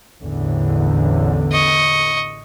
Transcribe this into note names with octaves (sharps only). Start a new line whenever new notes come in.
A1 E2 D3
D#5 C#6